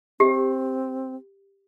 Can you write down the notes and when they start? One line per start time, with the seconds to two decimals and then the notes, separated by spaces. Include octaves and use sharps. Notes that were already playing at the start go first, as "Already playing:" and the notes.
0.20 C4 G4